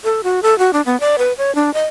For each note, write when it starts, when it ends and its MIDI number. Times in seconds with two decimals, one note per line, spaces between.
0.04 0.21 69
0.23 0.40 66
0.43 0.57 69
0.59 0.71 66
0.73 0.81 62
0.86 0.98 59
1.00 1.16 74
1.18 1.33 71
1.38 1.54 73
1.55 1.73 62
1.74 1.84 75